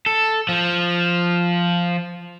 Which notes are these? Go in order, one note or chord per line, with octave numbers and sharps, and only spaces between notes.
A4
F3